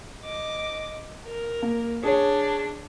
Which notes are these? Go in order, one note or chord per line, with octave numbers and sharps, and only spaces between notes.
D#5 D6
A#4
A#3
D4 G#4 C#5